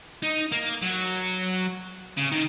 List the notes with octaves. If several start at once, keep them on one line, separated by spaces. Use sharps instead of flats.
D#4
A#3
F#3
C#3
D#3